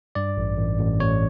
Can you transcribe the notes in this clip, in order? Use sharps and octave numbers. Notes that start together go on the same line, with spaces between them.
G2 D5
A1
A1
A1
A1 C#5